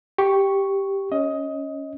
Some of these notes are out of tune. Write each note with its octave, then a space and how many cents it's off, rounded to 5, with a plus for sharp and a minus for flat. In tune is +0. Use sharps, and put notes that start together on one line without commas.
G4 +0 C#6 +0
C#4 +0 D#5 +15